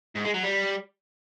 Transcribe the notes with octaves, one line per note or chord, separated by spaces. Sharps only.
G#2
G#3
F#3
G3